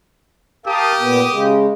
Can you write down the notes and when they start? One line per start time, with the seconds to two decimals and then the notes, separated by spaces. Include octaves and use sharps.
0.66 G4 A#4 F5 A5 D#6
1.00 A#2 B3
1.31 C#3 G#3